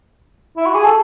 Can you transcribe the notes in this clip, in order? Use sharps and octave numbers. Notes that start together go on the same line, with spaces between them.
E4
F#4
G#4
A4